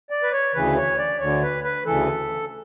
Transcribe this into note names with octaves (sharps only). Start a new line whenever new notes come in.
D5
B4
C#5
D2 C#3 E3 B4
C#5
D5
D2 D3 C#5
B4
B4
D2 C#3 E3 A4